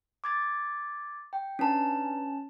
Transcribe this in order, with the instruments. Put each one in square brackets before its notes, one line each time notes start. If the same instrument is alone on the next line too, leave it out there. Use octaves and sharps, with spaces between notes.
[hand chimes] D6 G#6 A6
G5
[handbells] C#4 A5 [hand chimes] D4 B4 A#5